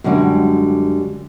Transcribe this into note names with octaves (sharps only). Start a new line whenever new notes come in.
F#2 D3 G3 G#3